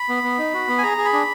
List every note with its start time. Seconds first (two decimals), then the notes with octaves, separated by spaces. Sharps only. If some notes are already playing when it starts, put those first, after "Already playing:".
Already playing: B5
0.09 B3
0.23 B3
0.38 D#4
0.54 F#4
0.68 B3
0.78 G#5
0.83 G#4 A#5
0.98 G#4
1.05 B5
1.13 D4